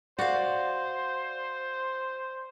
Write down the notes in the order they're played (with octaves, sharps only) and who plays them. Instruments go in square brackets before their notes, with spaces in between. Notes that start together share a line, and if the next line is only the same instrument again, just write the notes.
[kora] F#4 F#5 [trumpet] C5 [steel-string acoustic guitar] D5 F5